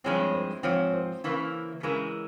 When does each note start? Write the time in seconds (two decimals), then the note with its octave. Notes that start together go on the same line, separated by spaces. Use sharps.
0.04 G2 F3 G#3 C4 E4 C#5
0.34 C5
0.63 G#2 F3 C4 C#5
0.93 C5
1.24 C#3 E3 A#3 E4
1.83 C#3 E3 G#3 E4 A#4